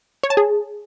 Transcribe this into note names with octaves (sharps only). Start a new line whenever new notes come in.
C#5
A5
G#4